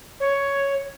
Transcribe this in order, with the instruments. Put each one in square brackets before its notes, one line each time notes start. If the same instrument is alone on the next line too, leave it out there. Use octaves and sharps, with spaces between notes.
[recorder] C#5